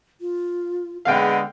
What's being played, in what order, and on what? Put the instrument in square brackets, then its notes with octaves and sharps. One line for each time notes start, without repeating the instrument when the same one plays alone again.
[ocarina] F4
[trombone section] D3 G#3 B3 [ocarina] G#4 [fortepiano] F5 G5